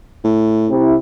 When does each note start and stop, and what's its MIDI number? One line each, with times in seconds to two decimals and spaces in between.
0.24 0.70 45
0.69 0.95 48
0.69 0.95 64